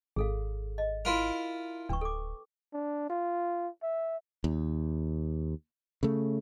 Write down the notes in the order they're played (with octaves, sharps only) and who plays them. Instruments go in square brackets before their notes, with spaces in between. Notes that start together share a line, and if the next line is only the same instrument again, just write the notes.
[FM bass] G#1 [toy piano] G#4 A4 F5
[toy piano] D#5
[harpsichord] E4 F4 A#4
[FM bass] D1 [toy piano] D4 B4 C#6
[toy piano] A4 D6
[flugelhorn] D4
F4
E5
[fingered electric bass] D#2
C#3 A3